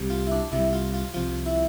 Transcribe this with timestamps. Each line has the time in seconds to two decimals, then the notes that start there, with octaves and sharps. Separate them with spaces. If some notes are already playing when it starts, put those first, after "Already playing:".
Already playing: C2 C3 G3
0.10 F4
0.27 E4
0.32 D4
0.52 C2 C3 E3 G3 E4
0.73 F4
0.94 F4
1.14 C2 C3 F3 F4
1.46 E4